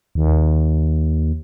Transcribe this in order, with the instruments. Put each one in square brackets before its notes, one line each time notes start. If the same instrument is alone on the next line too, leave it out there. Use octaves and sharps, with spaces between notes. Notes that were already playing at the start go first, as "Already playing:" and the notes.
[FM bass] D#2